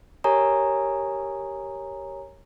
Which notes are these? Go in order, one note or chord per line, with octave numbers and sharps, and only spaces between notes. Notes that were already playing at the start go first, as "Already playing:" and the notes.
G4 A#4 C#5 G#5 A#5 D#6